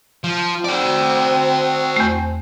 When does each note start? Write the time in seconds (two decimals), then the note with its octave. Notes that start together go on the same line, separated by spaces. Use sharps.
0.24 F3
0.65 C4 F#4 D5
1.96 E2 A3